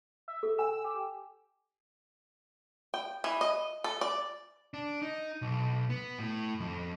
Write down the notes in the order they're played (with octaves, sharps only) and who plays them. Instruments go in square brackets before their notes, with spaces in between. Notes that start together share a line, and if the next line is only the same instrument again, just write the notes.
[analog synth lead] E5
[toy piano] A4
[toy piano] A4 G#5 [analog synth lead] E6
[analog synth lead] G4
[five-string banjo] G5
E3
D#5
A4
D5
[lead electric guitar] D4
D#4
B1
B3
A2
F2